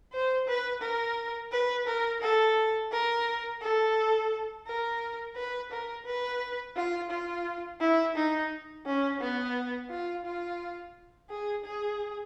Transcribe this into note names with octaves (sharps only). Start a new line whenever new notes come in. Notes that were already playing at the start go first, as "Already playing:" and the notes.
C5
B4
A#4
B4
A#4
A4
A#4
A4
A#4
B4
A#4
B4
F4
F4
E4
D#4
C#4
B3
F4
F4
G#4
G#4